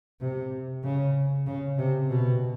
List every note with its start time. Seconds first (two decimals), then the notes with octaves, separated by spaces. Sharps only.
0.20 C3
0.84 C#3
1.47 C#3
1.78 C3
2.09 B2